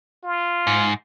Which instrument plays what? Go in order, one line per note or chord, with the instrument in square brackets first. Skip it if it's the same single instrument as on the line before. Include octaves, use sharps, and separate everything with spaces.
[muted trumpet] F4
[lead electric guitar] G#2